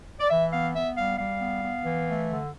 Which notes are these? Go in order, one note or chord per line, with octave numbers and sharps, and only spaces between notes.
D5
E3 E5
B3 F5
B3 E5
G3 F5
G3 F5
B3
B3
E3
A3
D3